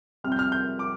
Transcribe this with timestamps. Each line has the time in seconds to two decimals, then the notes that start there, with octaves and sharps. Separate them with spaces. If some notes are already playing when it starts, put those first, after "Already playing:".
0.24 F2 C3 G3 F6
0.32 G6
0.39 F6
0.52 G6
0.79 D6